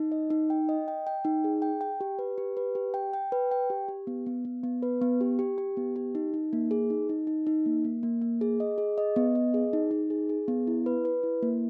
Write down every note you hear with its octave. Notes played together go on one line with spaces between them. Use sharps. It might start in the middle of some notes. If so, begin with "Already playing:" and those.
Already playing: D#4
D#5
D#4
G5
D#5
G5
G5
D#4
G#4
G5
G5
G4
B4
G4
B4
G4
G5
G5
B4
G5
G4
G4
B3
B3
B3
B3
B4
B3
G4
G4
G4
B3
G4
D#4
D#4
A#3
G#4
D#4
D#4
D#4
D#4
A#3
A#3
A#3
A#3
G#4
D#5
G#4
D#5
B3
D#5
G#4
D#4
D#4
G#4
G#4
B3
E4
B4
B4
E4
A#3